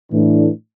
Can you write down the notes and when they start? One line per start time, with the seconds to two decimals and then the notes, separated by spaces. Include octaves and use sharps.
0.12 A2 E3 D4